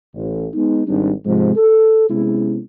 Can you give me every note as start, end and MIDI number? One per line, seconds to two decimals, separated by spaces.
0.15 0.46 33
0.54 0.83 56
0.54 0.83 59
0.54 0.83 63
0.87 1.10 32
0.87 1.10 55
0.87 1.10 60
0.87 1.10 62
0.87 1.10 63
1.25 1.53 44
1.25 1.53 48
1.25 1.53 53
1.25 1.53 56
1.56 2.07 69
2.09 2.59 48
2.09 2.59 56
2.09 2.59 59
2.09 2.59 61
2.09 2.59 64